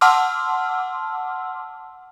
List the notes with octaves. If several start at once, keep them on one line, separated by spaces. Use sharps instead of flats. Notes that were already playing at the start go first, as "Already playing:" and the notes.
F#5 A5 C6 D6 E6 F6